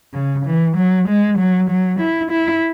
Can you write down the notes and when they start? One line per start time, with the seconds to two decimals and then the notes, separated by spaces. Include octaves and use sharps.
0.14 C#3
0.46 E3
0.77 F#3
1.08 G#3
1.38 F#3
1.70 F#3
2.00 E4
2.31 E4